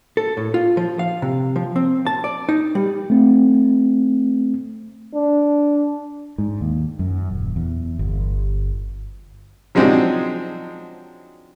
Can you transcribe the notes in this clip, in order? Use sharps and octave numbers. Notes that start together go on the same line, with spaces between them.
A4
A2
F4
F3
F5
C3
F3
C4
A5
D5
D#4
G3
A3 C4
D4
G#2
D#2
F#2
D#1
E2
G1
F3 F#3 G#3 C4 D4 D#4